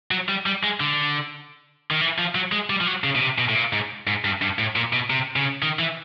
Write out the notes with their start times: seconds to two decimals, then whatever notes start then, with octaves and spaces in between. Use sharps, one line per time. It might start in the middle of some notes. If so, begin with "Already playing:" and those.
0.11 F#3
0.29 G3
0.46 G3
0.63 G#3
0.80 D3
1.91 D#3
2.01 E3
2.18 F3
2.35 F#3
2.52 G#3
2.70 G3
2.81 F3
2.87 F#3
3.04 C#3
3.15 B2
3.21 C3
3.38 B2
3.49 A2
3.55 A#2
3.73 G#2
4.07 G#2
4.25 G2
4.42 G2
4.59 A2
4.76 A#2
4.93 B2
5.10 C3
5.36 C#3
5.63 D#3
5.79 E3